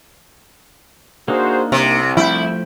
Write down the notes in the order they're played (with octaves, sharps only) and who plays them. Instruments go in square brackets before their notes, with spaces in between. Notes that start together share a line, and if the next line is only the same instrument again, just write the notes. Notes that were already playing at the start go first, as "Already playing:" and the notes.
[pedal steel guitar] A#3 D4 D#4 [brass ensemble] F#4 G#4 C5
[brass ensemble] C2 [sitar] C3
[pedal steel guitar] F3 A3 G5 [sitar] E4